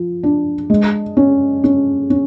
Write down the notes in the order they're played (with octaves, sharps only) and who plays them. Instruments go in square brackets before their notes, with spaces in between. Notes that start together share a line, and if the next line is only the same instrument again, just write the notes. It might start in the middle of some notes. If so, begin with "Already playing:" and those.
Already playing: [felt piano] F3
D4
G#3
C#4
C#4
C#4